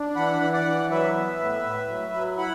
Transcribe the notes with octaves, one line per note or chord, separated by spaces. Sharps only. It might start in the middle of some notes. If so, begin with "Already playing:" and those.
Already playing: D4
E3 F#5 B5
E3
D5 F#5
E3
F#3 B4 E5
B3
A2
A2
F#3
F#3
E4 F#5 B5